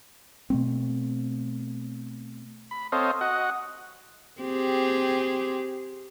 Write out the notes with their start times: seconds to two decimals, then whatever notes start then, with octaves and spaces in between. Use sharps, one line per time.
0.50 B2 A3 C4
2.71 B5
2.92 C4 A4 C5 C#5 D#5 F5
3.21 F#4 D#5 F#5
4.41 C4 G4 G#4